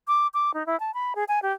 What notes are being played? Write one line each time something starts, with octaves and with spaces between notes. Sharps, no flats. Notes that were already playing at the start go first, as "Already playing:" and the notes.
D6
D6
D#4
E4
A5
B5
G#4
G#5
G4